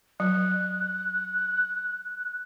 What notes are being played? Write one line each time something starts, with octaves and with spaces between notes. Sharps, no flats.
F#3 F#6